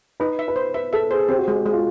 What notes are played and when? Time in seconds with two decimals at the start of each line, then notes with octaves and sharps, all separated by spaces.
0.20 D#4 B4
0.39 E5
0.48 B4
0.56 C5
0.74 B4 E5
0.93 A4 E5
1.11 G#4 C5
1.29 C4 G4
1.38 F#4
1.48 G#3 G4
1.66 G#3
1.73 F4